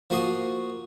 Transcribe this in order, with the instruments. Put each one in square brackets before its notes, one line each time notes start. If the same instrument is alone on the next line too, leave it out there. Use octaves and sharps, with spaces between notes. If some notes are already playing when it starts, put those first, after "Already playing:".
[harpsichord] F3 A#3 F#4 C6 D#6